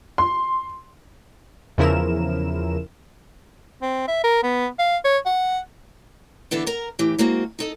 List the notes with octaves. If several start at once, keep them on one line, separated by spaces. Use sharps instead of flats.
C6
E2 C#3 F3 E4 A#4 E7
C4
E5
A#4
B3
F5
C#5
F#5
D3 E3 B3 D4 E4 A4
A#4 A#5
A2 E3 G4
G#3 A#3 C4 F#4
D#4 A4 D#5